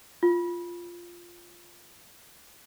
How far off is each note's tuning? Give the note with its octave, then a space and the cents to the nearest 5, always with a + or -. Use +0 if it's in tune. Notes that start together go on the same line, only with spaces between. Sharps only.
F4 -5